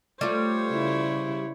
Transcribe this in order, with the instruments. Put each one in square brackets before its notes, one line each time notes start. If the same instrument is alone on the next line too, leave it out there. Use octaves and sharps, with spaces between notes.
[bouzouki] G3 [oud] A3 F4 [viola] C5 C#5
[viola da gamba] C#3 E4